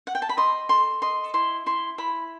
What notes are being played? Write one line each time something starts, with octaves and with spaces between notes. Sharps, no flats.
F#5
G5
A5
B5
D#5 C6
A4 C6
D#5 C6
E4 C6
E4 C6
E4 B5